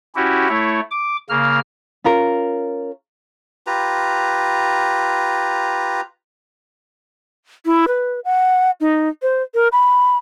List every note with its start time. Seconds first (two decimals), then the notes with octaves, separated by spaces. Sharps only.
0.15 C#4 E4 F#4 G4
0.49 A3 E4 C#5
0.91 D6
1.29 C#3 A#3 F6
2.04 C#4 F4 A#4
3.67 F4 G4 B4 A#5
7.65 E4
7.88 B4
8.25 F#5
8.80 D#4
9.22 C5
9.55 A#4
9.72 B5